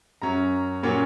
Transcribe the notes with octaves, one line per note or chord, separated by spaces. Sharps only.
F#2 F#3 C#4 A#5
A#2 F#3 A#3 C#4